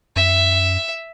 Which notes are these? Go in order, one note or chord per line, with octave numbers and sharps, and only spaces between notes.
F#2 E5